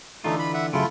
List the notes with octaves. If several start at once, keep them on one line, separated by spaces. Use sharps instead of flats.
D3 E3 A3 D#4 F4
B5
E5 F#5
F#2 C#3 A3 E4 F4